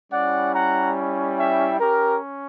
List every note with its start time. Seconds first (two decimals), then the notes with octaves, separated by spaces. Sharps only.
0.11 G3 C#4 E4 D5 F#5
0.54 F#5 A#5
1.38 E5 G5
1.80 C#4 G4 A#4